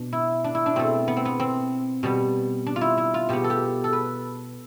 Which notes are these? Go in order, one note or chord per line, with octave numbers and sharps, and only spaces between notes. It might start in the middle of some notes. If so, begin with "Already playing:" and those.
Already playing: B2 D4
E4
D4
E4
D4
B2 A3 C4
B3
C4
B3
C4
B2 G3 B3
D4
F4
E4
E4
F4
B2 B3 G4
A4
G4
A4
B4